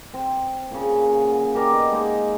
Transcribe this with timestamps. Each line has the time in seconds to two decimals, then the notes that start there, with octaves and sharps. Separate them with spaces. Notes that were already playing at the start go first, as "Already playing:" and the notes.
0.14 C4
0.71 A#2 C#3
1.12 F#5
1.55 G4 A#4 D5 A5
1.71 B3 D#4 D#5
1.91 G#3 A#3 D#4